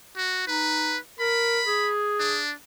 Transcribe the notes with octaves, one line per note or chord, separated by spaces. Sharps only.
F#4
D#4 B4
A#4 B5
G#4
D4